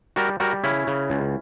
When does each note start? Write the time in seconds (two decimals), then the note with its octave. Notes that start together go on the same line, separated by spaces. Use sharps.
0.16 G3 F#4 A#4
0.40 G3 F#4 A#4
0.64 C#3 C#4 E4
0.87 C#3
1.10 C#2